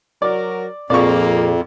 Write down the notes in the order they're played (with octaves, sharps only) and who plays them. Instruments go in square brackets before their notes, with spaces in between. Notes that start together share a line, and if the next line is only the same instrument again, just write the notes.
[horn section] F#3 F#4 A#4 [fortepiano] D5
[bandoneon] F2 [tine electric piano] A#2 C4 G#4 [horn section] F3 A#3 [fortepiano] D5 C#6